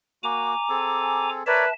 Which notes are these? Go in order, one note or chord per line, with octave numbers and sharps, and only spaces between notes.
A#3 F#4 G#5 A#5 D6
C4 G#4 A4
A#4 B4 C#5 D5 E5 A5